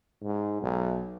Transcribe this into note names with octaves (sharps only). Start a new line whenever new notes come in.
G#2
B1